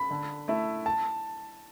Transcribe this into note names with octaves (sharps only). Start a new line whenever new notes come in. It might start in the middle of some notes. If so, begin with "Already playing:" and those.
Already playing: B5
D3
A3 E4
A5